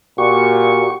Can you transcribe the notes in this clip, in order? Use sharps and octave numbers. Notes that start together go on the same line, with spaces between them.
A#2 F#4 G4 C#6